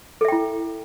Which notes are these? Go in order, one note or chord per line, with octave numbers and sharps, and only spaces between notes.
E4 A4 E5 G5